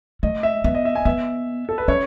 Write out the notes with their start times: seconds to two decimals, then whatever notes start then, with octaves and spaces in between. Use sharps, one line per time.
0.23 A3 D#5
0.43 E5
0.64 B3 E5
0.74 D#5
0.85 E5
0.95 G#5
1.05 B3 E5
1.69 A4
1.78 B4
1.88 C#4 C#5